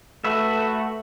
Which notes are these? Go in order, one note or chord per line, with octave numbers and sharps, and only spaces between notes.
A3 F#4 B4 E5